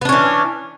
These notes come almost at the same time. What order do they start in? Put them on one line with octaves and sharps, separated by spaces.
B3 D4 C#4 E3